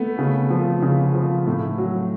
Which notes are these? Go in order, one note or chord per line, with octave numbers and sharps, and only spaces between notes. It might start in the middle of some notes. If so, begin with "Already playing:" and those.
Already playing: A3 B3
C#3
F3
C#3
F3
A2
F#3